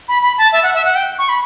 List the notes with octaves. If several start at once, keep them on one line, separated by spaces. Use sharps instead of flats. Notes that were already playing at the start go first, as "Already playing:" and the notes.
B5
B5
A5
E5
F#5
E5
F#5
G5
C#6
B5